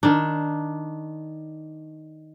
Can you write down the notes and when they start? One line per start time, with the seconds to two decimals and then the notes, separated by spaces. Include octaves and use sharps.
0.03 D#3 D4